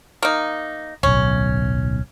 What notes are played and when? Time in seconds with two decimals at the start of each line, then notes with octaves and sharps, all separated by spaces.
0.22 A#3 D#4
1.03 D1 B1 C#4